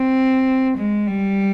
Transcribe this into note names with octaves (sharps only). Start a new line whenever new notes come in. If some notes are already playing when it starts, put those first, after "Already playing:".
Already playing: C4
G#3
G3